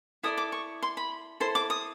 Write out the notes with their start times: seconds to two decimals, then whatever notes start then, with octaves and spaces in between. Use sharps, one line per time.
0.23 E4 A4 D5 D#6
0.38 D6
0.52 C#6
0.83 C6
0.97 B5
1.40 E4 A4 C5 C6
1.55 D6
1.70 D#6